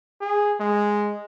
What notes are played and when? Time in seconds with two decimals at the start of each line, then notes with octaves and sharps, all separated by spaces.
0.21 G#4
0.60 G#3